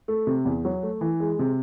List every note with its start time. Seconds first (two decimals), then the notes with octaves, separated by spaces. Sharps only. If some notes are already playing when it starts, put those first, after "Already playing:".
0.08 A3
0.27 C3
0.45 E2
0.65 F#3
0.83 A3
1.01 E3
1.20 G#3
1.39 C3